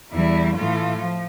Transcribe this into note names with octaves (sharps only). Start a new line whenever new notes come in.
E2 E3 G3 E4
A2 E3 A3 F4
F3